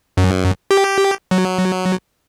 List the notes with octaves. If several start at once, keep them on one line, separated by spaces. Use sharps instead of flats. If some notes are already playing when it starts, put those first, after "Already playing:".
F#2
G4
F#3